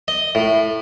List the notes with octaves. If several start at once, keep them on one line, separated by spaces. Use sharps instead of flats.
D#5
A2